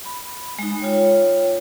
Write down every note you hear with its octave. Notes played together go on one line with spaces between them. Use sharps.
B5
G#3 D#4
F4 C#5 G5